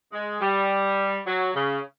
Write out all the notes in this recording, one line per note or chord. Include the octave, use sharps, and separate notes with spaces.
G#3
G3
F#3
C#3